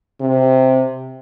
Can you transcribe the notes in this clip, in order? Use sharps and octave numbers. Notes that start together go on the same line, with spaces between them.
C3